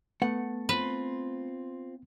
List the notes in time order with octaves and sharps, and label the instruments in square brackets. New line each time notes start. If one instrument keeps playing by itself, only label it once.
[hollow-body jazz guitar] A3 F#5 [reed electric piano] B3
[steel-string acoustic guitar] C4 F4 [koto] B4